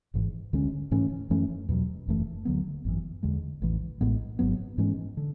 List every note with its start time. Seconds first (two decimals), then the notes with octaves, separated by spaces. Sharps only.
0.14 G#1 G#2 E3
0.53 D2 D3 G#3 C#4
0.91 G#2 E3 A3 C#4
1.30 F#2 E3 A3 C#4
1.69 E2 B2 F#3
2.07 F#1 F#2 E3 A3
2.45 D2 D3 F#3 B3
2.85 G#1 F#2 E3
3.23 E2 D3 G#3
3.62 A1 A2 E3
4.01 A1 A2 G#3 B3
4.39 G#1 G#2 F#3 B3
4.78 G#2 E3 G#3 C#4
5.17 D3